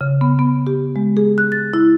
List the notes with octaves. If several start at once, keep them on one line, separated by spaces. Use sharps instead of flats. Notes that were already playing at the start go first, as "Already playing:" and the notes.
C#3
B3
B3
G4
G#3
G#4
F#6
A6
E4